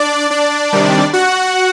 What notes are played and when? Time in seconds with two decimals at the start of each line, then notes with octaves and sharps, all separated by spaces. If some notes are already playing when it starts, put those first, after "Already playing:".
Already playing: D4 D5
0.30 D4 D5
0.73 C3 D#3 G3
1.13 F#4 F#5